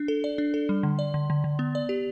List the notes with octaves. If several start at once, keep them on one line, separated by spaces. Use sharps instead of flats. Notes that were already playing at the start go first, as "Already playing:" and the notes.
Already playing: D4
A4
D5
D4
A4
G3
D3
D5
D3
D3
D3
B3
D5
G4